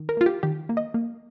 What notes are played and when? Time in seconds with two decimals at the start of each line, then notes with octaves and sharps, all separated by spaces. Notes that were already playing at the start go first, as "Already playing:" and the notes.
Already playing: D#3
0.09 A#4
0.17 A#3 F4
0.26 G4
0.43 D#3 G4
0.69 A#3
0.77 D#5
0.94 A#3